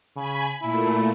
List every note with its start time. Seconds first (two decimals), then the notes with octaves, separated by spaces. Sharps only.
0.16 C#3 G#5 B5
0.62 A#2 A3 E4